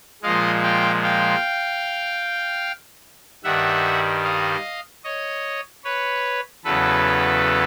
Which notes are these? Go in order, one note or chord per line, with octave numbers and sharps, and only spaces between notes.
A#2 F3 G#3 D#5 F5
F5 G5
F5 G5
G2 D#3 G3 E5 F#5
D#5 F5
C#5 D#5
B4 C#5
E2 C#3 F#3 A4 B4